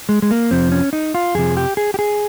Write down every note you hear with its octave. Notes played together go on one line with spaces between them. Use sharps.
G#3
G#3
A#3
F2 C3 F3 C4
C#4
D#4
F4
F2 C3 F3 G#4
G4
G#4
G4
G#4